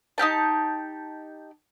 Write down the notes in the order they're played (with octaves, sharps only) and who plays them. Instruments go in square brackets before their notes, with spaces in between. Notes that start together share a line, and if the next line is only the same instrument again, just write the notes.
[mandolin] D#4 E4 G4 A5